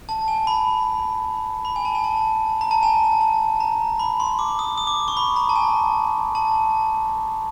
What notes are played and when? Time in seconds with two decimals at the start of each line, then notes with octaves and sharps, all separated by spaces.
0.09 A5
0.28 G#5
0.47 B5
1.65 B5
1.76 G#5
1.85 A5
1.95 G#5
2.04 A5
2.61 A#5
2.71 A5
2.83 G#5
3.21 A5
3.60 A#5
3.99 B5
4.20 C6
4.39 D6
4.59 D#6
4.77 D#6
4.87 D6
5.08 C#6
5.17 B5
5.36 A#5
5.49 A5
5.56 G#5
6.35 A5